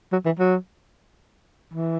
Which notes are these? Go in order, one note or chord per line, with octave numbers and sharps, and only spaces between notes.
F#3
E3
F#3
E3